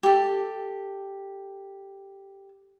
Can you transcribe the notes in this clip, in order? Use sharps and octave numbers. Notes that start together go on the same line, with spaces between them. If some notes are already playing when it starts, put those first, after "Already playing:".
G4 A4